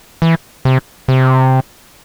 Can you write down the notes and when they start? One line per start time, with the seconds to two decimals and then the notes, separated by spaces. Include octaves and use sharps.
0.22 E3
0.65 C3
1.08 C3